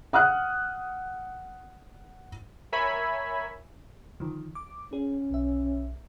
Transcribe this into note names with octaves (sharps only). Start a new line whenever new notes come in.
F#5 D#6 F6 F#6
A#4 C#5 E5 G#5 B5
D3 D#3 F3
D6
C#4 G#4
B1 E5